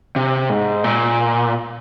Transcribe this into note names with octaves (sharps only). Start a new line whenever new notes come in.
C3
G#2
A#2